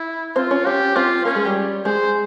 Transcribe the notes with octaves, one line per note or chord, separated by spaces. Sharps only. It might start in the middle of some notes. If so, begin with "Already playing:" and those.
Already playing: E4
C4 F4 C5
C#4 C#5
C#4 G4 C#5
C4 F4 C5
A#3 C#4 A#4
G#3 G#4
G3 G4
G#3 G#4 C5